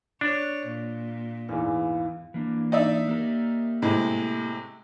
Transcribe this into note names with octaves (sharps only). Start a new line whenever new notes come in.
D4 C#5
A#2
E2 G#2 E3 F5
E3 A#3 D4
D#4 D5 E5
A#3 G4 A#4
A2 C3 G#3